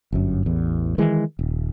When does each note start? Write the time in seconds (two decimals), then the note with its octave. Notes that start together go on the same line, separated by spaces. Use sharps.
0.12 G1 F#2
0.46 A1 E2
0.98 D#3 E3 G#3
1.39 D#1